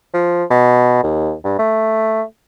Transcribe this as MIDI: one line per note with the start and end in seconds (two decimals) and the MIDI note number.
0.14 0.44 53
0.50 0.99 47
1.04 1.33 39
1.45 1.56 43
1.59 2.22 57